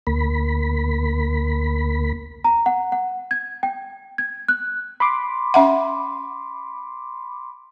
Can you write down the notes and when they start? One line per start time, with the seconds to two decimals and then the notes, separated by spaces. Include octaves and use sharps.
0.07 D2 A#3 B5
2.44 A#5
2.66 F#5
2.92 F#5
3.31 G#6
3.63 G5
4.18 G#6
4.48 F#6
5.00 B5 C6 D6
5.54 C#4 E5 F#5